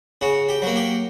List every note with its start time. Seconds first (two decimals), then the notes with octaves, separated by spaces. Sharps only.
0.21 C#3 F#4
0.49 G4
0.62 F#3 A#3
0.76 G4